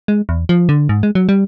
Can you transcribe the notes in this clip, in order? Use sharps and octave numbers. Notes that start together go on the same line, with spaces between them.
G#3
E2
F3
D3
G#2
G#3
F#3
G3